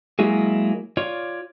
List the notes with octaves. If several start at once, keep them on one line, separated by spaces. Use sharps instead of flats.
F#3 G#3 A#3 E4 F#4 G#4
F4 C#5 D5